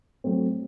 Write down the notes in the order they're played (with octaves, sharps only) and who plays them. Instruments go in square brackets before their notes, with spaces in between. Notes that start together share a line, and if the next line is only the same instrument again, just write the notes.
[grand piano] F#3 A3 C4